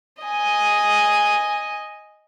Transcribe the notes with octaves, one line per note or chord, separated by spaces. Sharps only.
D#5 G#5